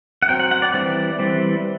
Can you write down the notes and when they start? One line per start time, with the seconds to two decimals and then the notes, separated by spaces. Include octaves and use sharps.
0.22 F#5
0.28 F#3 C4 G5
0.39 F#5
0.51 F#5
0.62 D5
0.74 E3 G3 C4 D5
1.19 E3 G3 C4